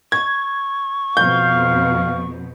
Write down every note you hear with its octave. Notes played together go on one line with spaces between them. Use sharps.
C#6 G#6
F2 B2 F5 G6